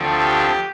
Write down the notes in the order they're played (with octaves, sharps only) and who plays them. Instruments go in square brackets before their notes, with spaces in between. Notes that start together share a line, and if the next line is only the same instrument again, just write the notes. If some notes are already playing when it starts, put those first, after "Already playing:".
Already playing: [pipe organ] D2 D3 F3 C4
G4